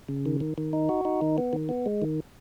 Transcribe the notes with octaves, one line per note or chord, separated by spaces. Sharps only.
C#3
D#3
D#3
D#3
D#4
F#4
D#4
D#3
B3
D#3
B3
G#3
D#3